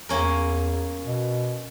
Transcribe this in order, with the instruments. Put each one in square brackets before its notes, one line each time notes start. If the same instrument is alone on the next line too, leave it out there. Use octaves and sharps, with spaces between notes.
[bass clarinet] E2 [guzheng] A#3 C#4 A#4
[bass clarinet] B2